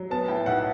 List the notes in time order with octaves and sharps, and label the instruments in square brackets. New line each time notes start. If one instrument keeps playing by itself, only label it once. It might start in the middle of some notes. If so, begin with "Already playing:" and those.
Already playing: [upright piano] F#3
B3 A5
A2 G5
B1 F#5